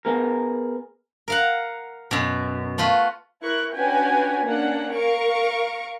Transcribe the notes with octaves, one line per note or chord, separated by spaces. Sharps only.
B3 G#4 A#4
A#4 F5 F#5
F#2 B2
A3 F4 F#4 B4
E4 A#4 C#6 F#6
C#4 D4 F#4 B4 G5 G#5
A#3 C#4 D4 F#5
A#4 F5 C#6 D7